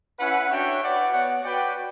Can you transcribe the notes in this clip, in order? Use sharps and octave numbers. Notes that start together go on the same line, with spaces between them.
C#4 E4 B4 F#5
D4 F#4 C#5 E5 G5
F#4 B4 D5 F#5
B3 F#4 C#5 F#5
F#4 B4 D5 G5